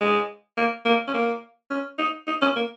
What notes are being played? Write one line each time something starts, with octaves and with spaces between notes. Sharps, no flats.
G#3
A#3
A#3
C#4
A#3
C#4
D#4
D#4
C#4
A#3